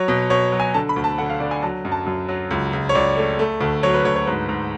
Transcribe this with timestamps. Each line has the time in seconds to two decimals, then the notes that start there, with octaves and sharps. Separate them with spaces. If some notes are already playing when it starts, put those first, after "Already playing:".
Already playing: F#3 C#5
0.08 B2
0.30 B2 C#5
0.52 F#3
0.60 G#5
0.74 D3 A5
0.89 B5
0.96 D2
1.04 A5
1.18 D3 F#5
1.30 F5
1.40 D3 D5
1.51 G#5
1.62 F#3 A5
1.85 F#2
1.92 A5
2.06 F#2
2.28 F#3
2.51 C#2
2.73 C#2
2.89 C#5
2.95 C#2 D5
3.17 A3
3.39 A3
3.61 D2
3.83 F#3 C#5
3.94 B4
4.05 D2 C#5
4.16 C#5
4.27 G#2 B4
4.49 G#2